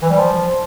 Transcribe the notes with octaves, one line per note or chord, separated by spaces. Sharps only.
E3
G3
F3